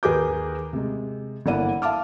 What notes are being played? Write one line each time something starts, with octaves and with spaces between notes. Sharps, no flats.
D#2 G#4 A#4 B4 D6 G6
C3 G#3
G1 A#3 E4 D5 F#5 D#7
E5 F5 A5 D6 F6